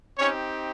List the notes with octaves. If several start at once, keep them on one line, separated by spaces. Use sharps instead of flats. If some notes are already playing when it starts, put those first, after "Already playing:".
C4 C#4 D#4 G4 C#5